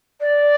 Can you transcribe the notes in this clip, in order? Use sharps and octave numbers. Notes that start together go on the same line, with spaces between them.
D5